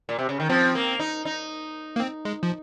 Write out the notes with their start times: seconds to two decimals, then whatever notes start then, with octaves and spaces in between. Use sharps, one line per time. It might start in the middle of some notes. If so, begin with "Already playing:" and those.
0.09 A#2
0.19 C3
0.29 C#3
0.40 D#3
0.49 F3 C4
0.75 A#3
1.00 D#4
1.25 D#4
1.96 A#3
2.00 C4
2.25 G#3
2.43 F3